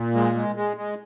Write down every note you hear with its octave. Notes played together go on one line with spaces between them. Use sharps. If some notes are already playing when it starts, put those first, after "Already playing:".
Already playing: A#2
G#3
G#3
G#3
G#3